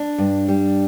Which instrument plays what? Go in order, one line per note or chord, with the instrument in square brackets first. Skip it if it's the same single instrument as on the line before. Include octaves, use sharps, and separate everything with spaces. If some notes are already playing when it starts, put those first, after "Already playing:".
Already playing: [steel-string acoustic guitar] D4
G2
G3